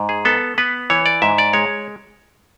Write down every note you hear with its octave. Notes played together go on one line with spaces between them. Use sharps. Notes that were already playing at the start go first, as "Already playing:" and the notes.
Already playing: G#2
G#4
B3 A4
B3 B4
E3 C#5
D5
G#2 E5
D5
G#3 C#5